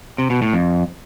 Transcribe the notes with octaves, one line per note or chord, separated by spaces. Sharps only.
C3
B2
A2
F2